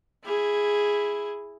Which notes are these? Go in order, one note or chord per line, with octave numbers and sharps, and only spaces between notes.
E4 G#4